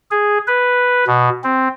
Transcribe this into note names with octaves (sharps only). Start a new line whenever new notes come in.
G#4
B4
B2
C4